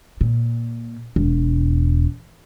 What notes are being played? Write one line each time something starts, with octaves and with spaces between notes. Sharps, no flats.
A#2
E1